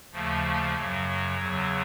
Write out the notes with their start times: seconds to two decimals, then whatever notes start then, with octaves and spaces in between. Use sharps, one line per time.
0.12 D#2 C#3 F3 A3
0.75 F#2 C#3 F#3
1.38 E2 C#3 F#3